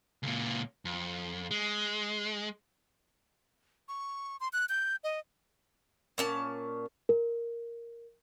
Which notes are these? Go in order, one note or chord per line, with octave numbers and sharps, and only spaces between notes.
C#2 A#2
F2
G#3
C#6
C6
F#6
G6
D#5
A#2 C#4 A5
A#4